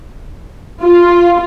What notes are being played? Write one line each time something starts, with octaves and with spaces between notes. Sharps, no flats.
F4